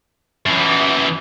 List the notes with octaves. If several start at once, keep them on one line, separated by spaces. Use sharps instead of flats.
F#2 E3